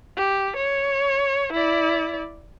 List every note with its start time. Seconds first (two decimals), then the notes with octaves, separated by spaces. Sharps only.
0.17 G4
0.57 C#5
1.53 E4 D5